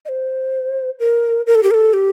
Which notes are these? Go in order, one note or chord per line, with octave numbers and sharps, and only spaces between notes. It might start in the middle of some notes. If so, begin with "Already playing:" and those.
D#5
C5
A#4
A#4
A4
G4
A#4
A4
G4